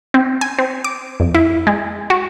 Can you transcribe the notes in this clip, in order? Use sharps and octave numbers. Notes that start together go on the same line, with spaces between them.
C4
G#5
C4
D6
F2
E4
G#3
F#4